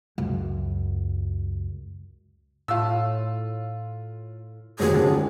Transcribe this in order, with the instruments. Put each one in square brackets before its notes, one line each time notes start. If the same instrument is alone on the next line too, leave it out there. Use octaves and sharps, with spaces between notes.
[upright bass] C#2 F#2
[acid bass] A2 [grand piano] F4 E6
[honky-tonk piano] D#2 G#2 [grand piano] F#3 [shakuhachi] G#4
[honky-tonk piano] C#2 F#2 [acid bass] D3